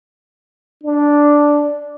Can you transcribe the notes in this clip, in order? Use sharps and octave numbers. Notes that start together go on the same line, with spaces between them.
D4